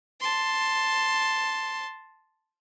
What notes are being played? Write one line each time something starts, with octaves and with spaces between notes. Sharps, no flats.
A5 C6